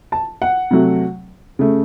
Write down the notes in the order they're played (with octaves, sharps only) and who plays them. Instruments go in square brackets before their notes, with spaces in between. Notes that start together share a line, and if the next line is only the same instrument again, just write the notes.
[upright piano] A5
F#5
C3 F#3 A3
C#3 A3